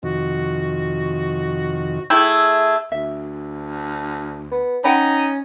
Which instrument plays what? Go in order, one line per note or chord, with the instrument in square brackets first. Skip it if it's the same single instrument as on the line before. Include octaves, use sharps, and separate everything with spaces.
[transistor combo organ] F2 C3 D#3 [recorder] F#4
[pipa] A3 E4 G5 [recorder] G#4
[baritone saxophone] D2 [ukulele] E5
[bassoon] B3
[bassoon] C#4 [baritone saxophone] D#4 [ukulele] F#5 G5 B5